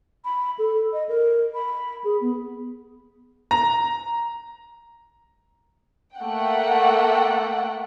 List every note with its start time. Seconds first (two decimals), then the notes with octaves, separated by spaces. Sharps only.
0.25 B5
0.59 A4
0.93 D#5
1.09 A#4
1.54 B5
2.04 G#4
2.21 B3
3.51 A#5
6.18 A3 A#3 F#5 G5